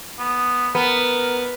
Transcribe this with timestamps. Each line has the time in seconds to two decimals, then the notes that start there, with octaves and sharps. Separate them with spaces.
0.19 B3
0.75 B3 A#4